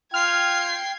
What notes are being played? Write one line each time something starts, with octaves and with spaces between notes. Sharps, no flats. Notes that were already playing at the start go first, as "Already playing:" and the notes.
F4 G5 F6 G#6 C7